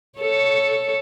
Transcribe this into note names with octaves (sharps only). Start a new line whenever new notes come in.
A4 C#5